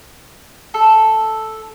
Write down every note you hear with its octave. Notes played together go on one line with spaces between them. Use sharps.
A4